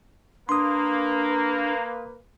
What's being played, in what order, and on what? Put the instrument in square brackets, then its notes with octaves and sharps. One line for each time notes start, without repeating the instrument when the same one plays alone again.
[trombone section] A#3 [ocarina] D4 [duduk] B4 [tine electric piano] C6 D#6